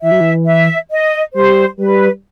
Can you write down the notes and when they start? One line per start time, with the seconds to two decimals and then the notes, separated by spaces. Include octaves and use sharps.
0.02 E3 E5
0.12 F#3
0.20 E3
0.46 E5
0.90 D#5
1.34 G3 C5
1.77 G3 B4